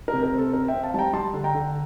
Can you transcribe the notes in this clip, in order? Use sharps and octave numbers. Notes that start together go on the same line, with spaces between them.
A#4
C3
A#4
C4 A4
C4 A#4
E5 G5
C4
F5 A5
G3 G5 A5 A#5
G3 A5 C6
D3
G5 A#5
D3